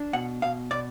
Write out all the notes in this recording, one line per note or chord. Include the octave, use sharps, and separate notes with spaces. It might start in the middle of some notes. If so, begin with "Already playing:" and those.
Already playing: D4
B2 F#5
B2 F5
B2 D5